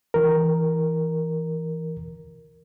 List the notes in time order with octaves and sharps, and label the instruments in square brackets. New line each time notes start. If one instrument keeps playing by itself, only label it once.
[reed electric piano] E3 A#4